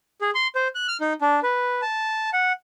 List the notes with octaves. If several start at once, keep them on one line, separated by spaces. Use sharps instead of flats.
G#4
C6
C5
F#6
F6
D#4
D4
B4
A5
F#5